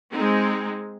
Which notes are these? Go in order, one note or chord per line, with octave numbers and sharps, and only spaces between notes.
G#3 C4 D#4